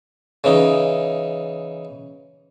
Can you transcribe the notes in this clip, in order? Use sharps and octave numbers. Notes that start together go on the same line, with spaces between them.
C#3 E3 D#4